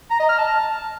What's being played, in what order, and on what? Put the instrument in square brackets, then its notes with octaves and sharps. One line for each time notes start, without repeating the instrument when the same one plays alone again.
[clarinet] A#5
D#5
F6
A5